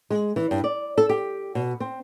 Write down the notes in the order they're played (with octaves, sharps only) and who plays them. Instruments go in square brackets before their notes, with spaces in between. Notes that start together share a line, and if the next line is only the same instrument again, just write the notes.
[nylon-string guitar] G#3
E3
G2
D5
A4
G4
B2
C4